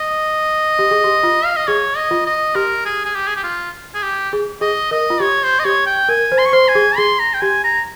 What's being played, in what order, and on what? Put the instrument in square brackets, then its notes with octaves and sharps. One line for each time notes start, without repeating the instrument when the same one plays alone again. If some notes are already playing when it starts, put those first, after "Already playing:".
Already playing: [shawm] D#5
[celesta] G4
G#4
G4
F4
[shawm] F5
D#5
[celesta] G#4 [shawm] C#5
[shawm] D#5
[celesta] F4
[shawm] D#5
[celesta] G4 [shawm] A#4
[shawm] G#4
G#4
G4
G#4
G4
F4
G#4
G4
[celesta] G#4
[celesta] G#4 [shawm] D#5
[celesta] A#4 [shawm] D#5
[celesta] F4
[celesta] G4 [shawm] C#5
[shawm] C5
D#5
[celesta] G4 [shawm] C#5
[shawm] G5
[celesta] A#4 [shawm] G#5
[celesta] C5
[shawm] C6
C#6
[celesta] C5 [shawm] C6
[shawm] G#5
[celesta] G#4
[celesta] G#4 [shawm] C6
[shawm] A#5
G5
[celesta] G4 [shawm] G#5
[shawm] A#5